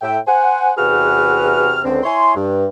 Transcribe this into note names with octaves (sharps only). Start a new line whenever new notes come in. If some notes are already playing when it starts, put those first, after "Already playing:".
A2 E5 G5
C5 F#5 G#5
E2 C3 F#4 G#4 B4 F6
C#2 D3 C4
E4 C#5 G#5 C6
G2